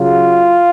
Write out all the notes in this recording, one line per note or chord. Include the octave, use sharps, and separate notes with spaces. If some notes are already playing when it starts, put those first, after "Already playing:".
Already playing: C#3 F#3 F4